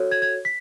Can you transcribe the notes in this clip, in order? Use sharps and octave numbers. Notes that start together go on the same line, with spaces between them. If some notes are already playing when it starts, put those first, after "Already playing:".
Already playing: F#4 A4 C#5
G#6
G#6
B6